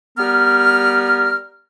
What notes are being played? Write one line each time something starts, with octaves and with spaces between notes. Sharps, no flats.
G3 B3 A#4 F6